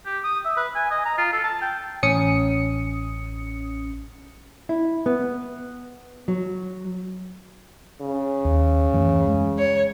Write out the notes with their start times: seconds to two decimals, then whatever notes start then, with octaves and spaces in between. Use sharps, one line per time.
0.05 G4
0.24 D#6
0.45 E5
0.57 B4
0.75 G#5
0.91 D#5
1.05 A#5
1.18 F4
1.32 A4
1.44 A5
1.61 G5
2.03 A1 C#4 D#6 C#7
4.69 E4
5.06 B3
6.28 F#3
8.01 C#3
8.45 D#2
8.93 F#2 E3 A3
9.27 G#3
9.59 C#5